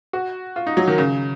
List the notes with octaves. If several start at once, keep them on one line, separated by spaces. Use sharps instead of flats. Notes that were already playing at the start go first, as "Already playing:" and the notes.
F#4
F4
D#4
F#3
D#3
C#3